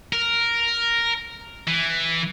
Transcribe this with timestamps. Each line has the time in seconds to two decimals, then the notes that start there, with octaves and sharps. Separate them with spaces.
0.13 A#4
1.67 E3